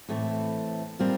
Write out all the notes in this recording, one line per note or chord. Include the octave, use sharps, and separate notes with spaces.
A2 E3 A3 C4
G3 C4 F4 A#4